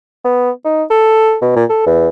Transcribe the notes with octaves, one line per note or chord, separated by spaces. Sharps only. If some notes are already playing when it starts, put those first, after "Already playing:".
B3
D#4
A4
B2
A#2
A4
E2